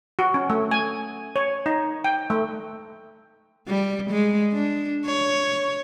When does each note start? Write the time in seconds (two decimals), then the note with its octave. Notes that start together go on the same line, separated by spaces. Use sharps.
0.19 F#4
0.34 C#4
0.50 A3
0.71 G#5
1.36 C#5
1.66 D#4
2.04 G5
2.30 A3
3.68 G3
4.11 G#3
4.53 D4
5.06 C#5